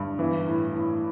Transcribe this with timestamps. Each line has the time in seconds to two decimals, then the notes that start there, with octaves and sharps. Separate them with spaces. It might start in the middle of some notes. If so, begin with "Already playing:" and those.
Already playing: G2
0.19 E3
0.47 A2
0.73 A2